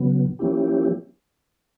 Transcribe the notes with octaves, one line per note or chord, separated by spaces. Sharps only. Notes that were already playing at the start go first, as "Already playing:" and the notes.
Already playing: C#3 F#3 B3
F3 A#3 C#4 E4 G4